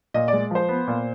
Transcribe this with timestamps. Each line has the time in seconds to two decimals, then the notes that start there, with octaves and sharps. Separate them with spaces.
0.14 A#2 D#5
0.28 D5
0.33 G#3
0.51 F3 C5
0.69 B3
0.87 A#2